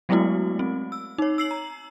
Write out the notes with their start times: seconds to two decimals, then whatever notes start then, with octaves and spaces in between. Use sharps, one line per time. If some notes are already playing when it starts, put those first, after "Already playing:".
0.09 F#3 G#3 A3 B3 E4 F#4
0.59 C4
0.92 E6
1.18 D#4 C#5
1.38 E6 C7 F#7
1.51 A#5